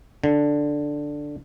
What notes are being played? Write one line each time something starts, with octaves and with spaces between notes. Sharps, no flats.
D3